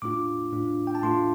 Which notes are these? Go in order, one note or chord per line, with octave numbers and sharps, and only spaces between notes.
A2 A3 D4 F4 D6
A2 A3 D4 F4
G5
A5
A2 A3 D4 F4 C6